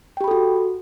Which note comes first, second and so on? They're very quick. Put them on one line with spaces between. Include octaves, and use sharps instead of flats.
G5 G4 B5 A4 F#4